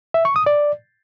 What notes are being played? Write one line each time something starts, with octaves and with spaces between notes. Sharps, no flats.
E5
C#6
D#6
D5